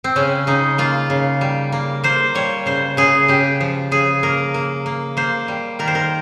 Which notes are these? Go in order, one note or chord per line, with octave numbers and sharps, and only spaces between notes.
C4
C#3 C#4
C#3 D#4
A#3 F4
C#3
G3
A#3
A#3 C5
G3 C#5
C#3 C5
C#3 G#4
C#3 G4
F3
C#3 G#4
A#3 A#4
A#3
A#3
A#3 C5
G3
D#3 A#4
C5
A#4